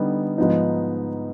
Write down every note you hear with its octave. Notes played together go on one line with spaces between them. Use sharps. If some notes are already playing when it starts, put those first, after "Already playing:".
Already playing: D3 G3 B3 D#4
G#2 F3 B3 D#4